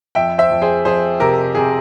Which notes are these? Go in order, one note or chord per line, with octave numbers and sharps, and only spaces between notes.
F2 E5 G5
C5 E5
F2
G#4 C5
F2 G#4 C5
C3 G4 A#4
C3 G#4